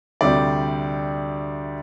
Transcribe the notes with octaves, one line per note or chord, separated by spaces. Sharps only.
D2 C3 G3 D5